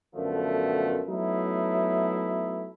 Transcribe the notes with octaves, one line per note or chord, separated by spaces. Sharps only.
F#2 B2 D3 F3 A3
F#3 A3 B3 D#4 E4